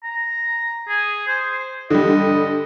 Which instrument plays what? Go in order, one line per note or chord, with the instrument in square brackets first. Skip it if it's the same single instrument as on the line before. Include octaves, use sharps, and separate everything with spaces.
[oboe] A#5
G#4
C5
[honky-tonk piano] D3 G3 [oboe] D#5